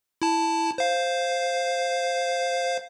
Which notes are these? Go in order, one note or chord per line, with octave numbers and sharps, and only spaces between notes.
E4 A5
C5 F5